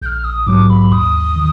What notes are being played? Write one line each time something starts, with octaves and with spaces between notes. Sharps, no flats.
A#1 F6 G6
D#6
G#2 F#3 D6
B5
D#2 D#6
D#3